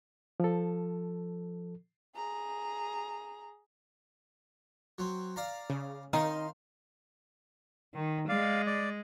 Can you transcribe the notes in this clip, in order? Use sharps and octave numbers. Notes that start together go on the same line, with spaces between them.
F3 A4
G#4 A#5
F#3 C4
D5 F5 A#5
C#3
D#3 D#4 F5 G5 C6
D#3
G#3 D5 F5
D5